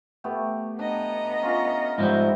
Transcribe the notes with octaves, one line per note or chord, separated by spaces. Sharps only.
A3 B3 G4
B3 D4 D#5 A#5
C#4 F4
G#2 F3 G3 C4 E4